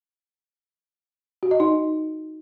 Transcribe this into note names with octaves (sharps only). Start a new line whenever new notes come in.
F#4
D#5
D#4